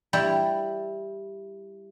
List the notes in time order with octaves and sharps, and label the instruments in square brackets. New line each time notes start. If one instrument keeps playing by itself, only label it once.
[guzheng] G3 E4